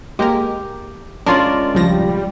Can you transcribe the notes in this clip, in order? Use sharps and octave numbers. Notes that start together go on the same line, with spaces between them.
G#3 A#3 G4 A#4
G#3 C#4 D4 F4 A#4 D5
C#2 F3 G3 A#6